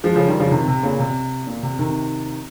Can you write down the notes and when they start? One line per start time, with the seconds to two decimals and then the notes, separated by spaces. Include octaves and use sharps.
0.04 F3 G#3
0.16 C#3 F3
0.28 D#3 G3
0.40 C#3 F3
0.51 C3 D#3
0.68 C3
0.83 A#2 C#3
1.00 C3
1.47 A#2
1.63 C3
1.79 C3 D#3